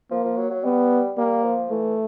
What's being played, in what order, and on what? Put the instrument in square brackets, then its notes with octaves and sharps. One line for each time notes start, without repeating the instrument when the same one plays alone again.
[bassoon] F3 [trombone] A#3
[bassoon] F3
F#3
F#3
[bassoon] G3 [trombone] B3
[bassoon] G3 [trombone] A#3
[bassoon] F3
[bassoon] E3 [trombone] A3